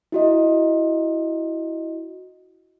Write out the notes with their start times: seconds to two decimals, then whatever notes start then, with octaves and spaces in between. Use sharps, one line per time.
0.12 E4 F#4 D#5